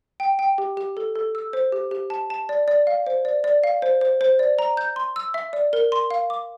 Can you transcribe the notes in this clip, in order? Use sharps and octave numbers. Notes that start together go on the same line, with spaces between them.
G5
G5
G4
G4
A4
A4
E6
C5
G4
G4
A5
A5
D5
D5
F5
C5
D5
D5
F5
C5
C5
C5
D5
A#5
G6
C6
E6
E5
D5
A#4
C6
F5
D6